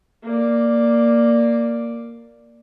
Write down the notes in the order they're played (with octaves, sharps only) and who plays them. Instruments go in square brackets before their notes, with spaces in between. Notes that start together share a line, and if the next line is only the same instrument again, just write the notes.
[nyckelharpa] A#3 D5